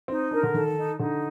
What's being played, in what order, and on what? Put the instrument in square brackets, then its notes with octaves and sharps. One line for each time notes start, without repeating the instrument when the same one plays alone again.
[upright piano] C4 [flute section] D#4
[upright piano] D4 [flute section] A#4
[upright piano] D3
[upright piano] D#3 [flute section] A4
[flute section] D#4
[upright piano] D3 [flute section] D#4